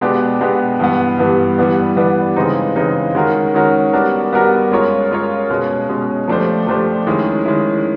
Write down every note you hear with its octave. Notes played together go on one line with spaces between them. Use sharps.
B2 G#3 B3 D4 G4
B2 G#3 B3 D4 G4
G2 E3 G3 B3
G2 E3 G3 B3
E3 G3 B3 D4
E3 G3 B3 D4
C#3 E3 G#3 C4 D#4
C#3 E3 G#3 C4 D#4
D#3 G#3 C#4 F#4 A#4
D#3 G#3 C#4 F#4 A#4
G3 B3 D4 F#4 A#4
G3 B3 D4 F#4 A#4
G#3 C#4 F4 A#4 C#5
G#3 C#4 F4 A#4 C#5
B2 G#3 C#4
B2 G#3 C#4
F3 A3 D4 G4 C5
F3 A3 D4 G4 C5
D#3 G#3 C#4 E4
D#3 G#3 C#4 E4